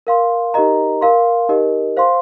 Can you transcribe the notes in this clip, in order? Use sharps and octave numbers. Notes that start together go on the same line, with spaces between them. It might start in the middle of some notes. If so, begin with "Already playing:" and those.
A#4 F5 C6
D#4 G4 A#4 D#5 A#5
A#4 F5 C6
D#4 G4 A#4 D#5
C5 F5 C6